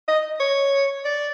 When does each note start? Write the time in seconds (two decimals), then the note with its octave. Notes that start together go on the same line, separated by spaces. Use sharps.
0.08 D#5
0.40 C#5
1.05 D5